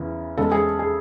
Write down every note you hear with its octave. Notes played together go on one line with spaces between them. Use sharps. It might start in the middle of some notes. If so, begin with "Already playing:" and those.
Already playing: E2 C#3 E3
E2 C#3 G#3 A4
G#4
G#4